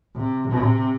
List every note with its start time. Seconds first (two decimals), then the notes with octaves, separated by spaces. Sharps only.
0.16 C3
0.49 C3